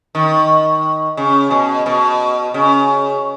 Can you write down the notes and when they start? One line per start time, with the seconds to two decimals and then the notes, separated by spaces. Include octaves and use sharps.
0.15 D#3
1.17 C#3
1.51 B2
1.86 B2
2.54 C#3